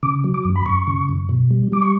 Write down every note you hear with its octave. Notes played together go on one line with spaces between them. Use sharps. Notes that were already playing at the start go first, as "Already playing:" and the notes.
C#3 D6
F#3
D6
F#2
B5
F#2 C#6
C#3
F#2
B2
G3
G3 D6
C#6